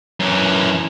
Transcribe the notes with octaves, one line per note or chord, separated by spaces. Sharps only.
F#2 E3